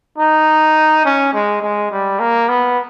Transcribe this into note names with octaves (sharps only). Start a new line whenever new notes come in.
D#4
C#4
G#3
G#3
G3
A#3
B3